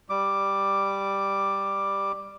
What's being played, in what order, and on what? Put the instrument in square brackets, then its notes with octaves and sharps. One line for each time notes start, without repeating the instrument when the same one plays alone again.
[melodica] G3 D6